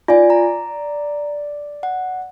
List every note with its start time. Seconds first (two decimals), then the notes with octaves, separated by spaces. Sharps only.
0.08 F4 D5 G#5
0.30 A#5
1.83 F#5